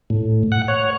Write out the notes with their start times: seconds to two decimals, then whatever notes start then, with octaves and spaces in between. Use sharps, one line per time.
0.10 A2
0.52 F#5
0.68 C#5